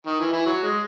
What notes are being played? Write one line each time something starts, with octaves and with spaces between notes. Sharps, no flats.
D#3
E3
E3
F#3
G#3